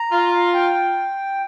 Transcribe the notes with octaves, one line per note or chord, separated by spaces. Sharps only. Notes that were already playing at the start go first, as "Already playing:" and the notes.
Already playing: A#5
F4
G5